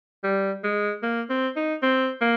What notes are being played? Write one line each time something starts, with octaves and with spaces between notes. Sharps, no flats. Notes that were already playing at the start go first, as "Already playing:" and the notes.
G3
G#3
A#3
C4
D#4
C4
A#3